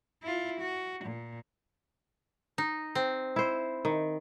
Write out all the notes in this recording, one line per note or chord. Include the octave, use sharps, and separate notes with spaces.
E4 F4
F#4
A#2
D#4
C4
E4 C5
D#3